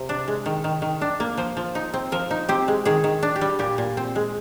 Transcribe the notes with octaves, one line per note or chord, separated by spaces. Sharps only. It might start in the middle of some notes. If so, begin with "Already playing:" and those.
Already playing: C3
D4
G#3
D#3
D#3
D#3
D4
A#3
F3 C5
F3
D#4
C4
F3 A#4
D#4
C4 G4
G#3
D#3 G#4
D#3
D4
G4
G3
A#2 G4
A#2
C4
G#3